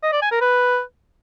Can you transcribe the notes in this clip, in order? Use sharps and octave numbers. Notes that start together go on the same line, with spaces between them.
D#5
D5
G#5
A#4
B4